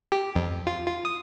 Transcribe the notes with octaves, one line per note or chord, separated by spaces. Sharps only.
G4
F2
F4
F4
D#6